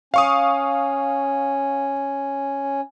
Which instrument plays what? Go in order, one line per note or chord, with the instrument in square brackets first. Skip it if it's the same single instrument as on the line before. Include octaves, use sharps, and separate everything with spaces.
[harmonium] C#4 [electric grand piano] F5 C#6 D#6